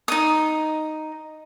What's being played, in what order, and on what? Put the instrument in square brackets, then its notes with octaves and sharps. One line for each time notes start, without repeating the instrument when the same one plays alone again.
[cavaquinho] D#4 D#6